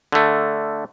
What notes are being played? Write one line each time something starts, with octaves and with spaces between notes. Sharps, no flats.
D3 A3